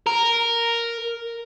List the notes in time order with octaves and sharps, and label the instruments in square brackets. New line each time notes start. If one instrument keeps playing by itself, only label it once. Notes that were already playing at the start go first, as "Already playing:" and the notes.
[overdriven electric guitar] A#4